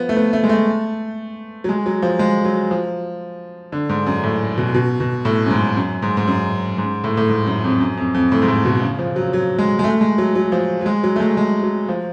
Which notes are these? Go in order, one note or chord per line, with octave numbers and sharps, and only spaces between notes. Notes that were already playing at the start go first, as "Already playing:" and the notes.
Already playing: F3 B3
A3
B3
A3
G#3
A3
F#3
G#3
F#3
F3
G#3
F#3
F3
D3
G#2
F#2
A2
B2
B2
B2
A2
F#2
G#2
F#2
G#2
G#2
F#2
G#2
A2
A2
G#2
F#2
F2
F#2
F2
F2
A2
G#2
A2
B2
C#3
F3
F#3
F#3
G#3
G#3
A3
G#3
F#3
F#3
F3
F#3
G#3
F#3
A3
G#3
G#3
F#3
F3